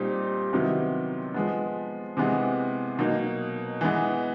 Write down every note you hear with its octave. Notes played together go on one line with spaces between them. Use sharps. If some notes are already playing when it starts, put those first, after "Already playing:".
Already playing: A#2 G3 C4 D#4 G4
C3 D#3 F#3 B3 E4
F3 G#3 B3
C3 E3 G#3 B3
B2 F#3 A#3 D#4
E3 G#3 B3